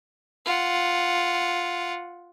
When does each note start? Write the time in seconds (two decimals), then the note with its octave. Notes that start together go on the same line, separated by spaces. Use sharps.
0.46 F4 F#5